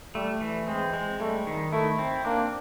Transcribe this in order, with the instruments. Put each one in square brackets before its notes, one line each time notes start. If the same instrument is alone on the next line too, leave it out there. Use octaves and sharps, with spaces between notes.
[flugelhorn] G3 [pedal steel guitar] A3
[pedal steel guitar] E3
[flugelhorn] G#3 [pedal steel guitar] C4
[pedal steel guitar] G#3
[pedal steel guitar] G3 [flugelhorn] A3
[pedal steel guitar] D#3
[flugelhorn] A3 [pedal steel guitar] E4
[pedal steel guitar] C4
[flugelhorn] A#3 [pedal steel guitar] D4